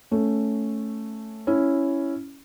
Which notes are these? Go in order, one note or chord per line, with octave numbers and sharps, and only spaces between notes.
A3 C#4
C#4 E4